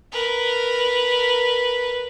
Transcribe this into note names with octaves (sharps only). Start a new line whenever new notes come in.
A#4 B4